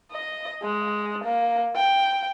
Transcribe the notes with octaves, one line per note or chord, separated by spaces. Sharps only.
D#5
G#3
A#3
G5